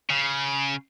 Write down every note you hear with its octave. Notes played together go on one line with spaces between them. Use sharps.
C#3